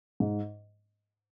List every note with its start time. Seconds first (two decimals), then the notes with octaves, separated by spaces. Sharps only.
0.20 G#2